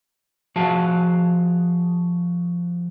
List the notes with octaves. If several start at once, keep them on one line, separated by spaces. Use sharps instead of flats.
F3 F#4 G#4 F5 A5